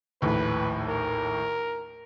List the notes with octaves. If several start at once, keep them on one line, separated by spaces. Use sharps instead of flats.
A#1 D#2 A2 B4
A#4